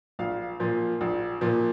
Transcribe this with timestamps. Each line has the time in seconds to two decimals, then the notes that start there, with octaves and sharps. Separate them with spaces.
0.19 A#1 F5
0.60 A#2 F3
1.01 A#1
1.41 A#2 F3